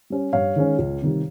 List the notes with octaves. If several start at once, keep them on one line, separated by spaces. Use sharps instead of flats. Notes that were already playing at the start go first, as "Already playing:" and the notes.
G3 C#4
G2 C#5 F5
D#3 G#3 C#4
C#2
C3 D#3 G3